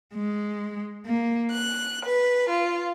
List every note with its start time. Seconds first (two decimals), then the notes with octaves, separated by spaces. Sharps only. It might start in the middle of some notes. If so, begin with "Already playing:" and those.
0.13 G#3
1.05 A#3
1.54 F#6
2.05 B4
2.51 F4